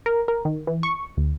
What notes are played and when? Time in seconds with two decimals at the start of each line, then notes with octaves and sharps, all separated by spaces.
0.06 A#4
0.28 A#4
0.45 D#3
0.67 E3
0.83 C#6
1.17 D2